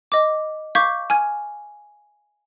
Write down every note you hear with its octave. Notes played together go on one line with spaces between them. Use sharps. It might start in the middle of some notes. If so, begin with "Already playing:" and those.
D#5 D6
F5 C#6 D6 G6 G#6 B6
G#5 F6 G#6